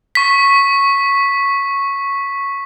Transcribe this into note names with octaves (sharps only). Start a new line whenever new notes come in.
C#6 B6